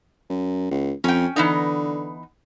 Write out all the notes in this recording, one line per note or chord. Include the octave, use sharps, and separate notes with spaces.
F#2
C#2
F2 C#4 G5
D3 E3 B3 D#4